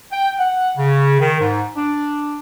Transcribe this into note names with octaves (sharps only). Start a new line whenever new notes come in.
G5
F#5
C#3
D#3
G#2
D4